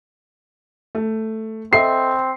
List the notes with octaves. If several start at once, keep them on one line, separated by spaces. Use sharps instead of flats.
A3
C4 A4 D#5 E5 C7